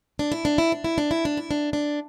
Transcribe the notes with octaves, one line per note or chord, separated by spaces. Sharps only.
D4
E4
D4
E4
D4
E4
D4
E4
D4
E4
D4
D4